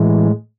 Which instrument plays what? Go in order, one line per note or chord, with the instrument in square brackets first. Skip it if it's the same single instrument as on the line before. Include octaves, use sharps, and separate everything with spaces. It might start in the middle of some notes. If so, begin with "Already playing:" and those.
Already playing: [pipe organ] A2 E3 G#3